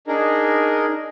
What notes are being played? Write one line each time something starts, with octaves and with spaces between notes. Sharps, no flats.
D4 D#4 G#4 A#4